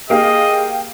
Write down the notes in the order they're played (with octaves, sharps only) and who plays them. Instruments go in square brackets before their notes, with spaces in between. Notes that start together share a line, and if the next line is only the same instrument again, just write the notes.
[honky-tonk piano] A#3 G4 F5 [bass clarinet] G#4 [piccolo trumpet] D#5 [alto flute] G5